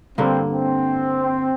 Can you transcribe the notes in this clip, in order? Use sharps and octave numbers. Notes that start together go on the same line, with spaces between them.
G2 D3 A#3 C4
C4